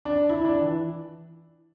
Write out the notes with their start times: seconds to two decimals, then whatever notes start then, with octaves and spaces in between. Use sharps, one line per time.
0.05 D4
0.29 E4
0.45 D4
0.61 E3